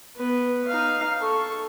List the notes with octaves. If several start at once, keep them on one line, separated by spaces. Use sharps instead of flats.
B3 B4
D#4 F5
A4 C#6